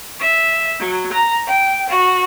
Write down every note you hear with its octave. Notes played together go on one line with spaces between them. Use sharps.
E5
F#3
A#5
G5
F#4